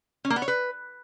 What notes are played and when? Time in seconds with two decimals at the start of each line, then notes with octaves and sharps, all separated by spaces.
0.25 C#4
0.30 A#3
0.36 B3
0.42 C#5
0.48 B4